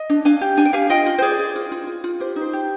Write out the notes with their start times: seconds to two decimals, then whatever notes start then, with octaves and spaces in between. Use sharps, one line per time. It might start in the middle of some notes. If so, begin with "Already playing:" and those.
Already playing: D#5
0.10 D4
0.25 D4 F5 G#5
0.41 G4
0.57 D4 G#5
0.65 G5
0.73 G4 F5 G#5
0.90 F4 D#5 G5
1.06 F4
1.18 C5
1.22 G#4 D5
1.39 G#4
1.56 F4
1.72 F4
1.87 F4
2.04 F4
2.20 G4 C5
2.36 D#4
2.41 C5
2.53 G4